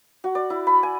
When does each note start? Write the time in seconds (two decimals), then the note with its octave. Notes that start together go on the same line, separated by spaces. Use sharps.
0.24 F#4
0.35 D5
0.50 E4
0.67 B5
0.83 G#5